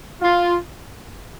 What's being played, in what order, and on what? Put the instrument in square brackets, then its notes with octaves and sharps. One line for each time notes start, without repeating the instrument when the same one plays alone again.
[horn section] F4